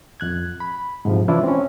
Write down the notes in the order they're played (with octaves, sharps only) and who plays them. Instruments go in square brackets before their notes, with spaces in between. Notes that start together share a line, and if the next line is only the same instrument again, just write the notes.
[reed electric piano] F2 F#6 G#6
B5
G#2 C3 F3
E3 C#4 D4 E4 F4
C4 C#4